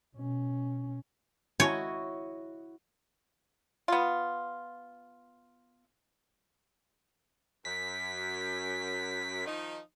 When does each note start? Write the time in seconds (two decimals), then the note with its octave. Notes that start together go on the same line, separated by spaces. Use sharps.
0.15 B2 C#4
1.60 E4 F#4 C#5 D#5
3.88 B3 F4
7.65 F#2 B6
9.46 D#3 F3 D#4